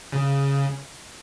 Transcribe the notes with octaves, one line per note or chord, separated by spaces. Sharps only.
C#3